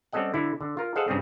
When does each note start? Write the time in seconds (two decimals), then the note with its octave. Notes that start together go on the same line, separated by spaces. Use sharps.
0.13 G3 C4 C#4 A4 D#5 F#5
0.34 D3 E4
0.61 D3
0.77 F4 A#4
0.96 G#4 A4 C5 D#5 F5 F#5
1.08 G2 C#3 G3 C4 G#4